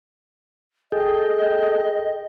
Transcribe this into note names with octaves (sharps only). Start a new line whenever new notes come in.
G#4 A4 D#5 G5